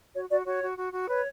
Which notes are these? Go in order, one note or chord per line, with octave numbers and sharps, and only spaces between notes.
F#4 C#5
F#4 D5
F#4 C#5
F#4
F#4
F#4
B4 C#5